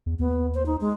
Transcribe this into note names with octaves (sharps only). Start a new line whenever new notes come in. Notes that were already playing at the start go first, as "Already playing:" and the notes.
E2
D#2 B3
C5
D#4
G#3